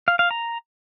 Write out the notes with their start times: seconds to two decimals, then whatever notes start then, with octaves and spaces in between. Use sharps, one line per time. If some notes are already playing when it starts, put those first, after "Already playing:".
0.08 F5
0.19 F5
0.31 A#5